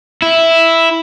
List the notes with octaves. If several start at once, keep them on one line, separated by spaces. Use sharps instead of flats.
E4